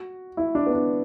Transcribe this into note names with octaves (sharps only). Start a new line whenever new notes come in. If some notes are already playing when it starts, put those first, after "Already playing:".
Already playing: F#4
E4
D4
B3
D4